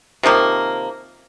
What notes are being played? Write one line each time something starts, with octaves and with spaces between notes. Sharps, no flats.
C3 D#3 F3 A#3